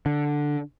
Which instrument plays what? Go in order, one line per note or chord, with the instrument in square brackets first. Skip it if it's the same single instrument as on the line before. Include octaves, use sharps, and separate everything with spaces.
[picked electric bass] D3